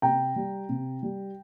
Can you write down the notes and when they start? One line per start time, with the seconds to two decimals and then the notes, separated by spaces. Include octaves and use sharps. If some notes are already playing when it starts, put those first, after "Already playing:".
0.02 C3 G5 A#5
0.36 G3
0.69 C3
1.03 G3